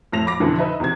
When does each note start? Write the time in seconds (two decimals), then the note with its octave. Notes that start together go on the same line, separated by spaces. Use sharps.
0.12 F2 A2 A#6 F7
0.26 B5 D6 A#6
0.40 F2 B2 D3 E3 D4
0.58 D#4 B4 C5 D#5 E5
0.80 E2 C3 C4 G#6